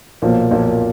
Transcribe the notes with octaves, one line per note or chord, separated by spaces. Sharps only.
B1 A#2 F3 A#3
B1 A#2 F3 A#3